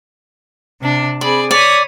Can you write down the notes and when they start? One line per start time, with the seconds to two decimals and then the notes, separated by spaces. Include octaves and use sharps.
0.81 C3 D4
1.21 C4 G#4 D5 B5
1.51 C#5 D5 B5 D#6